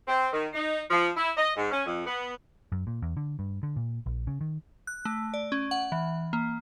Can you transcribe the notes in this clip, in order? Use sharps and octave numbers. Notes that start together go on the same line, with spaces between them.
C4
D#3
D#4
F3
E4
D#5
G#2
C#4
F2
B3
F#2
A#2
E2
D3
G2
D3
A#2
A#1
C#3
D#3
F#6
A3
D5
C#4
F#5
E3
A#3